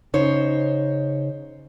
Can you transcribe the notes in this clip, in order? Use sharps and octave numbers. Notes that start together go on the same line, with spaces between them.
C#3 D#4 C5 C#5